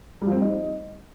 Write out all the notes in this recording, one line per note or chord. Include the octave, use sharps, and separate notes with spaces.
G3
F3
C4
G3
D#4